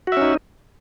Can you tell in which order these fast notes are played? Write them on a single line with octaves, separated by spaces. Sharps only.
F#4 E5 C#4 D#4